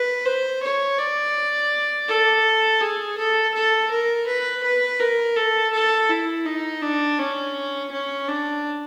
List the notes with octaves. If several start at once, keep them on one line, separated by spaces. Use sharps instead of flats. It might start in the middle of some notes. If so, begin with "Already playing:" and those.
Already playing: B4
C5
C#5
D5
A4
G#4
A4
A4
A#4
B4
B4
A#4
A4
A4
E4
D#4
D4
C#4
C#4
D4